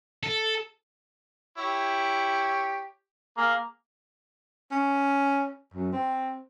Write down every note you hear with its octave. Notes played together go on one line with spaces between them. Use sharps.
A4
E4 G4 C#5
A#3 G#4
C#4
F#2
C4